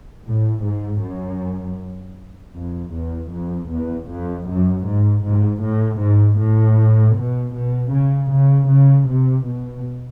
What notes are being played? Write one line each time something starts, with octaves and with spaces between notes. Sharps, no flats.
A2
G#2
F#2
F2
E2
F2
E2
F2
F#2
G#2
G#2
A2
G#2
A2
B2
B2
C#3
C#3
C#3
C3
B2